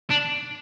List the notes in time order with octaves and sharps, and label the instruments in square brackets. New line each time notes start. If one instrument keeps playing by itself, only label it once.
[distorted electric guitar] D4